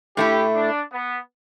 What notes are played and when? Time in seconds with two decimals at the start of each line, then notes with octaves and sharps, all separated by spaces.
0.17 A2 A3 E4 G4
0.55 D4
0.92 B3